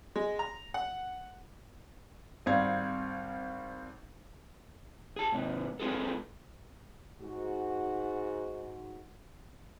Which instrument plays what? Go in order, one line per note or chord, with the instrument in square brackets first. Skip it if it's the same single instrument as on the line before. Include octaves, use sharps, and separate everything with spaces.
[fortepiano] G#3
A#5
F#5
[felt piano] G#1 G3 C4 F5 G#6
[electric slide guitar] G#4 A5
G#2 C3
G#3 C4 F4 G#4 A4
[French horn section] G#2 F#4